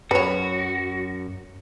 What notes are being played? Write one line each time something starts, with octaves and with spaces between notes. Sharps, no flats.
F#2 F#4 B4 C#5